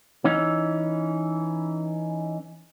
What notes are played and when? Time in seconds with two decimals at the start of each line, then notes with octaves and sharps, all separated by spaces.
0.24 E3 C#4 D#4